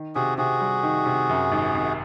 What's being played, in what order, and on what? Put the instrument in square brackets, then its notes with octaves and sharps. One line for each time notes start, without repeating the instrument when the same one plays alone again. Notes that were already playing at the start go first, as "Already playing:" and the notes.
Already playing: [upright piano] D#3
[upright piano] C3 [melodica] F#4 G#4
[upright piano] C3 [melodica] F#4 G#4
[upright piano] G3
D#3
C3
F#2
G#1
G#1